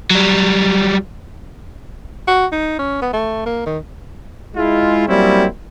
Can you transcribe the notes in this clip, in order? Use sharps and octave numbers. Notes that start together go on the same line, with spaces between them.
F#3 G3
F#4
D#4
C#4
B3
A3
A#3
D#3
G#3 E4 F4
F#3 G3 A#3 C4 C#4 E4